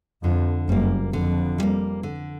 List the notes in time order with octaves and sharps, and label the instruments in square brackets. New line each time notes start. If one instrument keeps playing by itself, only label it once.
[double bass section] F2 [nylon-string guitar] D3
[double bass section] F#1 F#2 [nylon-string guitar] G3 A#3
[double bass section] F2 [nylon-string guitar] D3
[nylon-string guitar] G3 A#3
D3